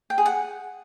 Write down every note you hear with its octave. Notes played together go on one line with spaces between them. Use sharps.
G5
G#4
F#5